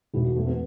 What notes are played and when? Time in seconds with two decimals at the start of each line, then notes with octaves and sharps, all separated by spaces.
0.14 E1 E4
0.24 F#4
0.35 E2 A3
0.47 B3